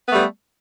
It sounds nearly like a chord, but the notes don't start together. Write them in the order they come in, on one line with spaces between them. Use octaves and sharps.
B3 A3 G3